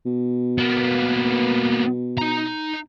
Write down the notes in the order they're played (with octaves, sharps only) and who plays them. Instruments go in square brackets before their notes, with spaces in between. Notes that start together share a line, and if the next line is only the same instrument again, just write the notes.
[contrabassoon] B2
[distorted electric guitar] A#3 B3
D#4 A#5